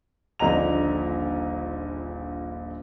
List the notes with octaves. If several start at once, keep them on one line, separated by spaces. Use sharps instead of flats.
D#1 A#1 D3 D#5 A#5 F7